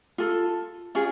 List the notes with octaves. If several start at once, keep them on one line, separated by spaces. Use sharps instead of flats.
F4 A4
C#4 F4 G#4